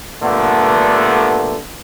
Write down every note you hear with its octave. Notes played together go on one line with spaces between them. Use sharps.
G2 A#2 D3 A3 B3